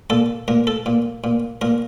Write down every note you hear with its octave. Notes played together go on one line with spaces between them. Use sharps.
A#2 A4
A#2 A#4
A4
A#2
A#2
A#2 A#4